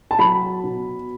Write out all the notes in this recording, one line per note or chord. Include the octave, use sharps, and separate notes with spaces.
A5
F#3 B5
B2